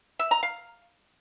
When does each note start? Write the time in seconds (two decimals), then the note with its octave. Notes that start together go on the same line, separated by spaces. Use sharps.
0.19 E5
0.31 A#5
0.43 F5